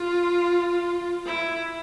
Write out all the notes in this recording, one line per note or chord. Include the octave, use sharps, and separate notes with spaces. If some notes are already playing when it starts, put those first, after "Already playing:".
Already playing: F4
E4